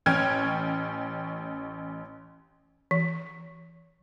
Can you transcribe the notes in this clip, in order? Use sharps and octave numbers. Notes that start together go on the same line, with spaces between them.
A1 C#4 G5 F6 G#6
E3